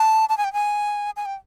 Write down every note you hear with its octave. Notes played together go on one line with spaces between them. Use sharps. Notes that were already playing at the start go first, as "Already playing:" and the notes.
Already playing: A5
A5
G#5
G5
G#5
G#5
G5